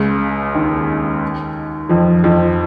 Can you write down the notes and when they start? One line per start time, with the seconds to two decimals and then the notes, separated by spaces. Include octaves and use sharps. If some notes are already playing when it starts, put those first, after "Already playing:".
Already playing: C#2 C#3
0.55 D#2 D#3
1.89 F2 F3
2.24 F2 F3